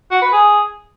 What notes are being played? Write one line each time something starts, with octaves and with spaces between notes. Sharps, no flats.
F#4
B4
G#4